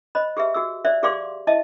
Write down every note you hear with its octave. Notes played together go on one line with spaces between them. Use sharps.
C5 D#5 B5
G4 G#4 B4 E5
F#4 G#4 E6
C5 D5 E5
G4 G#4 D5 F5 C6 D6
E4 D#5 E5 A5